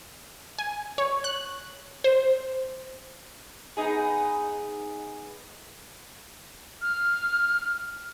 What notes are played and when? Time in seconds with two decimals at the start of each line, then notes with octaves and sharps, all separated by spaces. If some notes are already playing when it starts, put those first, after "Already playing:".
0.58 G#5
0.98 C#5
1.24 F#6
2.04 C5
3.77 B3 D#4 G#4
6.82 F6